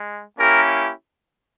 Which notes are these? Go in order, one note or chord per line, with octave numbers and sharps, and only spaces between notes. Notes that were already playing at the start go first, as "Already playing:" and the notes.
Already playing: G#3
A#3 C#4 E4 G4 A#4